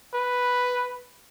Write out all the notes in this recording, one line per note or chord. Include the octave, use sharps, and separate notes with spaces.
B4